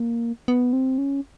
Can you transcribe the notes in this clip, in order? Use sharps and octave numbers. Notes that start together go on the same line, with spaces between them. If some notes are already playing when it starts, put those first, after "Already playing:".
Already playing: A#3
B3
C4
C#4